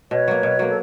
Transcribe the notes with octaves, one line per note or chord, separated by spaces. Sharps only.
B2 B4 C#5
F#3 A#3
B2
F#3 A#3
A4